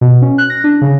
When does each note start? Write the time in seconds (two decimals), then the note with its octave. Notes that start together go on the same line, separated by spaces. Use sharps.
0.01 B2
0.22 C#4
0.38 F#6
0.50 A#6
0.64 D4
0.81 C#3